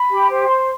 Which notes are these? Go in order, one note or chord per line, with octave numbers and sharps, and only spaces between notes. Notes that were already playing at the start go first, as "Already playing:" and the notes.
Already playing: B5
G4
C5
C6